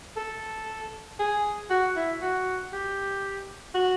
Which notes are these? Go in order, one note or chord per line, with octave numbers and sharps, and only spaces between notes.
A4
G#4
F#4
E4
F#4
G4
F#4